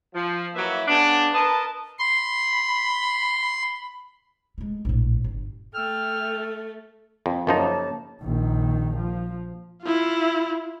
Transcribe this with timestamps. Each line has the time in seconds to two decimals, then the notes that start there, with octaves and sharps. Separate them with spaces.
0.14 F3
0.55 F#3 A#3 E4 B4 E5
0.88 C#3 B3 D4
1.34 A#4 B4 D#5 A5
1.99 B5 C6
4.58 G#3 A3
4.85 A#1 A2
5.24 G1
5.75 A3 G5 E6 F6
7.26 F2
7.47 F#2 C#3 F3 A#3 D#4 A5
8.23 A#1 D#3
8.96 F3
9.83 E4 F4